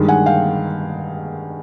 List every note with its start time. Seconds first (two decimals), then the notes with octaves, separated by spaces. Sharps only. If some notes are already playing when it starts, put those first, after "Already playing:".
Already playing: G2 D#3 G#3
0.08 F#5 G#5
0.26 F5 G5